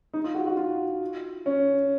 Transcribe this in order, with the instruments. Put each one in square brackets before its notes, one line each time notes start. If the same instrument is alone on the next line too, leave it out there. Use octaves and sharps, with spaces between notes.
[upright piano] D#4
F4
F#4
F#4
F4
C#4